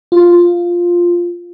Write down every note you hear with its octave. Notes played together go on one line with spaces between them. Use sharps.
F4